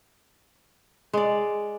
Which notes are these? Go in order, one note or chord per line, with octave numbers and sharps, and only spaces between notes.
G#3 D5